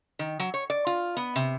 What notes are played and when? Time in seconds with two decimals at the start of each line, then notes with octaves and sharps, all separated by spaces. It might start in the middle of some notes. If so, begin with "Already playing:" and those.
0.19 D#3
0.40 F#3
0.54 C#5
0.70 D5
0.87 F4
1.17 B3
1.36 C3